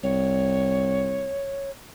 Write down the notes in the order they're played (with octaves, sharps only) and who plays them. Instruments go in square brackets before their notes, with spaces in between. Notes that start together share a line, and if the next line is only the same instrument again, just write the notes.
[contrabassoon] C2 [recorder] C#5